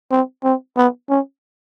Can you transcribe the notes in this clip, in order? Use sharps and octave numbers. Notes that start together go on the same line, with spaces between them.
C4
C4
B3
C#4